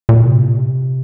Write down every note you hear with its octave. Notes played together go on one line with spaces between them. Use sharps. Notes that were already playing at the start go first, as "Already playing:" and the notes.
A#2
C3